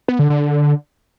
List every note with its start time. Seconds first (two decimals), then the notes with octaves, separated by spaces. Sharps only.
0.08 B3
0.19 D3
0.30 D3